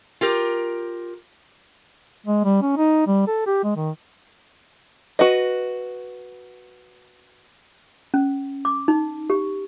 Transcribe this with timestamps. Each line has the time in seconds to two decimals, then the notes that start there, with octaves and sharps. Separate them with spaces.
0.21 F4 G4 A#4
2.26 G#3
2.44 G3
2.62 C#4
2.77 D#4
3.07 G3
3.27 A4
3.46 G4
3.64 G#3
3.76 D#3
5.19 F#4 B4 D#5
8.14 C#4
8.65 D6
8.88 D#4
9.30 G4